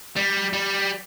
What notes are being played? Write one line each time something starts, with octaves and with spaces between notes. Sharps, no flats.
G3
G3